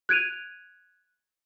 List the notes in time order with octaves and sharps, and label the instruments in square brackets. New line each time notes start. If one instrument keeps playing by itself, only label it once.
[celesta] F#6 G#6 D7 D#7 F7